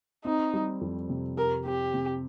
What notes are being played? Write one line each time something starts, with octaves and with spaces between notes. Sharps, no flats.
C4 D#4
G3
F2
C3
G4 A#4
C4 G4
C3